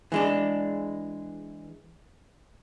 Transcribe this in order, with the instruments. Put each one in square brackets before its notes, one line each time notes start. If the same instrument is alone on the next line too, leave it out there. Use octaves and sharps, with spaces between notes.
[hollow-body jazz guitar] E3 G#3 D4